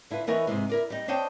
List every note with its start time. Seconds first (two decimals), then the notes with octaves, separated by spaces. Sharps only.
0.10 D3 E4 F4 B4
0.27 E3 B3 D#4 A#4 C#5 E5
0.47 G#2 C3 G#3
0.69 E4 A#4 D5
0.90 G3 D#4
1.08 D4 C5 C#5 D#5 G5 A5